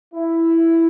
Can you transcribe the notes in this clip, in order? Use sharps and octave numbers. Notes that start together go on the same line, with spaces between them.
E4